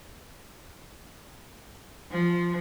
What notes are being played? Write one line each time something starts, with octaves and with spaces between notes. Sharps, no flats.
F3